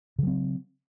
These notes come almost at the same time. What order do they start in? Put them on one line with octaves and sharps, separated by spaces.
C#3 F#3 C4